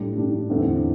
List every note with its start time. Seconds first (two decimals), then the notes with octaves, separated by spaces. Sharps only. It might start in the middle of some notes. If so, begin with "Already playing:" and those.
Already playing: A2 G3 D4
0.17 A2 G3 D4
0.50 E2 D3 C4 E4